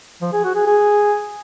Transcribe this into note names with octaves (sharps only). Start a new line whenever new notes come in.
F3
G#4
F#4
G#4
G#4